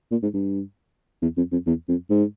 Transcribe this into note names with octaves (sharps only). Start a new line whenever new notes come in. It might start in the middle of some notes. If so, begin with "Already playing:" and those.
A#2
G#2
G2
E2
F2
F2
E2
F2
G#2